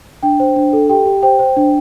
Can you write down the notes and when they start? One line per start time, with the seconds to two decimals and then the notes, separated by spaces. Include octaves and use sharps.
0.23 D4 G5
0.40 C5
0.56 D4
0.73 A4
0.89 G4 G5
1.06 G4
1.23 C5 G5
1.39 C5
1.57 D4